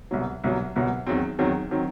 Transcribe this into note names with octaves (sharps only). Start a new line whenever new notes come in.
C2 B2 F#3
C2 B2 F#3
C2 B2 F#3
E2 D#3 F#3 C4
E2 D#3 F#3 C4
D#3 F#3 C4